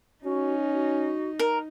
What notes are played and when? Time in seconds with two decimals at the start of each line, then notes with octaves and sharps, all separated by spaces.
0.24 C#4 D#4 F#4
0.73 F#4
1.39 A#4